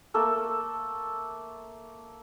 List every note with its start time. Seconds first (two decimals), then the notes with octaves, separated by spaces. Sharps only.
0.14 A3 A#3 A4